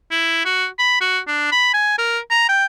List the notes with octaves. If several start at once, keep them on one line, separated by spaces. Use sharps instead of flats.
E4
F#4
B5
F#4
D4
B5
G#5
A#4
A#5
G5